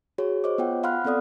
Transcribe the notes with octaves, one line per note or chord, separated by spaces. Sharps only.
F#4 G#4 C#5
C5 C#5 D#5 D6
B3 F4 F#5 G5
F5 F#5 B5 C6 F6 F#6
B3 C4 A4 D5 D#6